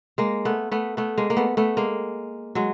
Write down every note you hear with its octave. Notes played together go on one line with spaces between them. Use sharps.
G#3 A#3
A3 B3
A3 B3
A3 B3
G#3 A#3
A#3
A3 B3
A3 B3
G#3 A#3
F#3 G#3